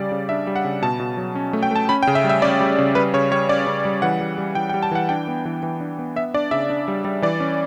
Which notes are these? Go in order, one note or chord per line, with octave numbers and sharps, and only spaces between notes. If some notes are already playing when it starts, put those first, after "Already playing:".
Already playing: C#3 G3 D5
C#3
D4 E5
G3
F#5
C#3
B2 A5
B2
F#3
C#4
A3
G5
A3 A5
C#4 B5
G5
C#3
E5
G3
E5
C#4 D5
G3
C#3
G3 B4
C#3 C#5
G3 C#5
C#4 D5
C#3
G3
E3 F#5
G3
G3
E3 G5
G5
G3
A5
E3 F#5
D4 G5
B3
E3
E3
D4
B3
B3 E5
D4 D5
C#3 E5
D4
G3
G3
E3 D5
C#4